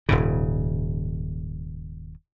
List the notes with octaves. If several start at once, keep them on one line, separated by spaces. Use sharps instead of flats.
D#1 G#2 C#3